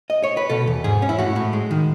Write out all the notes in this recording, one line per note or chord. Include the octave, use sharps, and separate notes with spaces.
D#5
C#5
B4
B2 A4
E2
G#2 G#4
C#4
E4
A2 F#4
A2
G#3
D#3